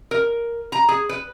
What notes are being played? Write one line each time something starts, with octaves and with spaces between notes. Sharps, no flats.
A#4
A#5
G#4
B4